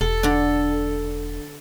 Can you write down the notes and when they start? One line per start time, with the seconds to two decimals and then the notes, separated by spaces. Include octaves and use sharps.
0.01 E1 A4
0.23 D3 D4